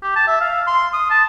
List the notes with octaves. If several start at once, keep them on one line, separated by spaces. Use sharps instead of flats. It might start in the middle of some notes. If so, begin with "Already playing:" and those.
G4
A5
E5
F5
C6
D#6
A5